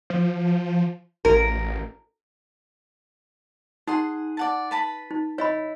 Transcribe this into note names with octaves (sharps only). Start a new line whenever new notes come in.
F3
A1 A#4
D#4 G#4 F#5 C6
D5 F#5 A5
B4 A5 B5
D#4
E4 C#5 D#5 B5